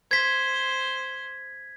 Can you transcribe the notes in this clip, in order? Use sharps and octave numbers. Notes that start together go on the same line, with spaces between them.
C5 G#6 B6